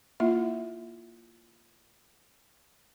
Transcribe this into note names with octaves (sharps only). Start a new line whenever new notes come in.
A#3 E4 F4 E5